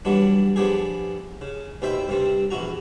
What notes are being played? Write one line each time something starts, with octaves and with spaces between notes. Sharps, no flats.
G2 E3 F#3 G3 B3 D4
F3 B3 D4 G4 G#4
C#3
D#2 B2 C4 E5 G5 B5
G2 C3 G3 C4
A#1 E2 E4 F#4 A#5